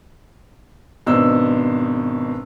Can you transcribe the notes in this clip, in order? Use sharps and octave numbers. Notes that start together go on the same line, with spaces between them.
G#1 B2 D4 D#4 C5 E6